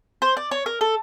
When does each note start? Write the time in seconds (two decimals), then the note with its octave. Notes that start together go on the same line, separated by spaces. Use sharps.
0.22 C5
0.37 D5
0.51 C#5
0.66 A#4
0.81 A4